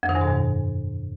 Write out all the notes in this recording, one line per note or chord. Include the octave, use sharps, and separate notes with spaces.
F2
D#3
G2
B2
G2